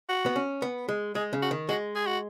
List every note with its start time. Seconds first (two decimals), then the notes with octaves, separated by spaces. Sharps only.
0.09 F#4
0.26 B3
0.36 C#4
0.62 B3
0.89 G#3
1.15 G#3 G#4
1.33 C#3
1.42 F#4
1.51 D#3
1.69 G#3 F#4
1.96 G#4
2.07 F#4